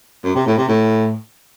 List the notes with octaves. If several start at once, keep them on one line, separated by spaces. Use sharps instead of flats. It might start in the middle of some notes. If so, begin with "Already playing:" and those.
F#2
C3
A2
C3
A2